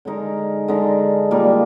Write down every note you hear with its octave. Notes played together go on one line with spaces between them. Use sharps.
D3 G#3 D#4 A#4
D3 G#3 D#4 A#4
A#2 G3 A#3